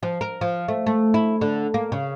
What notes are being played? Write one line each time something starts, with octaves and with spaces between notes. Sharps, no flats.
F3
A#4
F3
A3
A3
E4
D3
A#3
C#3